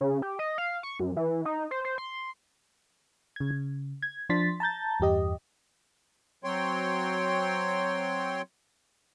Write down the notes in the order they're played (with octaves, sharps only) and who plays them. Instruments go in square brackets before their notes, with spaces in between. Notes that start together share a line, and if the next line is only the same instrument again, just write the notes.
[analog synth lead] C#3
G4
D#5
F5
C#6
F#2
E3
D#4
C5
C5
C6
[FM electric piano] C#3 G#6
C#3
G#6
F3 D4 C6 A6 B6
A5 A#5 G6 A6
E2 G2 G4 D#5
[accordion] F#3 C4 C#5 G5 C6